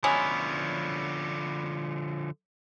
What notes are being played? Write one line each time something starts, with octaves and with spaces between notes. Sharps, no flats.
D3 F3 F#3 G#3 B3 C#4 E4